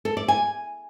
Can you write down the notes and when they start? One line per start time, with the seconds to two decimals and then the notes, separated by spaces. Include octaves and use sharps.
0.05 A4
0.17 D5
0.28 G#5